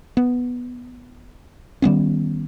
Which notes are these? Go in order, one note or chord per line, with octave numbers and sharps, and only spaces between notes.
B3
D#3 G3 B3 C#4